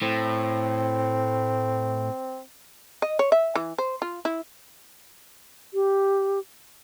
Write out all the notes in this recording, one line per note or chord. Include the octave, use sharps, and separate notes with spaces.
A2 C4
D#5
C#5
E5
E3
C5
F4
E4
G4